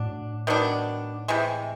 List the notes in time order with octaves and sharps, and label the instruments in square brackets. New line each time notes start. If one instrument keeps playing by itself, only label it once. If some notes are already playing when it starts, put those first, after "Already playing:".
Already playing: [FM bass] A2 [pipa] F#3 D4
[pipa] D#3 F#3 B3 D4
C3 E3 G#3